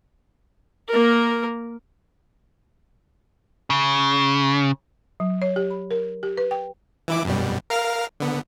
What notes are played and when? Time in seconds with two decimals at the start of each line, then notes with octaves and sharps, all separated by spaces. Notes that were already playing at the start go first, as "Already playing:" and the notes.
0.89 A#3 A#4
3.70 C#3
5.20 F#3
5.42 C#5
5.56 G4
5.70 B5
5.91 A#4
6.23 G4
6.38 B4
6.51 G5
7.08 E3 E4 D6
7.25 F#2 B2 G3
7.70 A#4 F5 F6
8.20 D3 B3